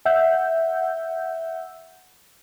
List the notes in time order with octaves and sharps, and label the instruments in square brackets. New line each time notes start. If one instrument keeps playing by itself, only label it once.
[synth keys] E5 F#5 E6 G6